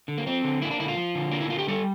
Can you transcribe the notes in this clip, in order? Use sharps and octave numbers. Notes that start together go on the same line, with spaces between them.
D3
A#3
F3 C4
D3
A#3 E4
D4
D3 E4
F4
F3
D3
A#3 D4
E4
D3 F4
G4
G3 A4